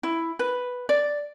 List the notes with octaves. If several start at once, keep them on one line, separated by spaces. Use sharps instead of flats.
E4
B4
D5